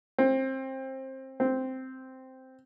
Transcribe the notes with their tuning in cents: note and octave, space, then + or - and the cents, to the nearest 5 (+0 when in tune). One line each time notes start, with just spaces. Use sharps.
C4 +20
C4 -5